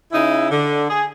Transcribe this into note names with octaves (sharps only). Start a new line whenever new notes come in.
C#3 D#4 E4
D3
G#4